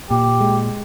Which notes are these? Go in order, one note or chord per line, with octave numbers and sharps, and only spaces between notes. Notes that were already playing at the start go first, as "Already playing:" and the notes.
A#2 G4
G#3